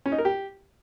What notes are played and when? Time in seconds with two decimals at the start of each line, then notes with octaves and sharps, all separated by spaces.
0.06 C#4
0.12 D#4
0.18 A#4
0.25 G4